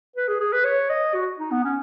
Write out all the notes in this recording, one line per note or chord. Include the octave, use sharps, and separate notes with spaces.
B4
G#4
G#4
B4
C#5
D#5
F#4
D#4
B3
C#4